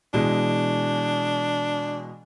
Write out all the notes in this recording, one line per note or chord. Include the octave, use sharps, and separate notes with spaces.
B2 E3 G#3 D4